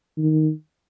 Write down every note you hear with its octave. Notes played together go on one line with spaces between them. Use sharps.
D#3